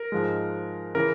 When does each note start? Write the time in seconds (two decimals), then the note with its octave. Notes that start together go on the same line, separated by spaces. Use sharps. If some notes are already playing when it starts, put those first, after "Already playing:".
Already playing: A#4
0.12 G#2 F3 G#3
0.95 C#3 E3 A#4